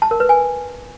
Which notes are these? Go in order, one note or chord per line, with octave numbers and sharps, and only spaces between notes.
A5
A#4
B4
G#5